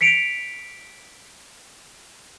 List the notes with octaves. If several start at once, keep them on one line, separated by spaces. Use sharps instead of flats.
B6 C#7 D7 F7